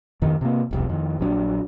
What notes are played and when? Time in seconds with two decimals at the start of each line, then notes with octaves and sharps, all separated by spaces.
0.22 F2 D#3
0.41 C3 A#3
0.71 E1 C2 F2
0.89 F2 D#3
1.19 A#1 F#3 D4